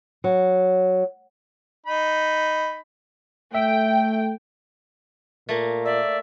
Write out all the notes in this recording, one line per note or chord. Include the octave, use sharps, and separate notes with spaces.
F#3
D#4 B5
A3 E5 G5
A#2 A3 A#3
D5 E5